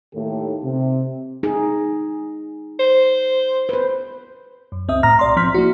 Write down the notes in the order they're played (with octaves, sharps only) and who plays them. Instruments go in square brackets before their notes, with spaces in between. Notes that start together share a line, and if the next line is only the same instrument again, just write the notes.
[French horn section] D#2 A2 D#3 A3 G4 A4
C3
[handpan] D#4 G#4
[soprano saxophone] C5
[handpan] B4 C5
[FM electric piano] F#2
C#2 C4 D#5 E5 D#6
A2 A#5 F6 A#6
B1 D5 C6
F3 C4 C6 F6 B6
A#3 E4 F#4